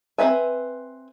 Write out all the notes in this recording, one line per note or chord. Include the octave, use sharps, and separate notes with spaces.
C4 F#4 B4 E5 G#5